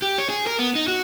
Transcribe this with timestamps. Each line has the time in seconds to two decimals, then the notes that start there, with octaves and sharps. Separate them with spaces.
0.02 G4
0.18 C#5
0.30 G#4
0.47 A#4
0.59 B3
0.75 D#4
0.88 F#4